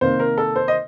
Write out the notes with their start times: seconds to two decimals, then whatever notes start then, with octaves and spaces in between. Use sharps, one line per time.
0.01 C3 D#3 A#3 C5
0.20 A#4
0.38 A4
0.56 C5
0.68 D#5